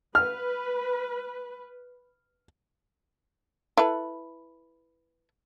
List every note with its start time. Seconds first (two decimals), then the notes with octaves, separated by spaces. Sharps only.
0.15 B4 F6
3.77 E4 A4 B4